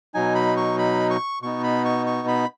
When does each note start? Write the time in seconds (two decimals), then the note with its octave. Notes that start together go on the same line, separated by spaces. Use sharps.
0.14 B2 F#3 D#4 G#5
0.35 B5
0.57 C#6
0.79 B5
1.10 C#6
1.42 B2 B3 D#4 C#6
1.64 B5
1.85 C#6
2.07 C#6
2.28 B5